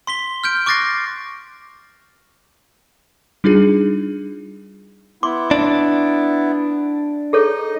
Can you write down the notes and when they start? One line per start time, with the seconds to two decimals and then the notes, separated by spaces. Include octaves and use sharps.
0.07 C6 B6 G7
0.44 F6 G6 D7
0.66 C#6 D6 F#6 A6 A#6 C7
3.44 G3 D4 D#4 F4 G#4
5.23 B3 E4 C6 D6
5.51 D4
7.33 D#4 G#4 A4 C#5 D#5